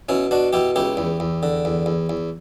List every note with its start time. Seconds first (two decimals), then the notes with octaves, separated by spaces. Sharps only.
0.09 B2 C#4 E4
0.31 B2 D4 F#4
0.53 B2 E4 G4
0.76 C#2 E4 G4
0.97 E2
1.20 E2
1.43 D3
1.65 E2
1.86 E2
2.10 E2